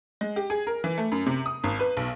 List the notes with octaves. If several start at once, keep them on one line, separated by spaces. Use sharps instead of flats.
G#3
G4
G#4
A#4
E3
A3
F#2
C3
D#6
G#1
B4
B1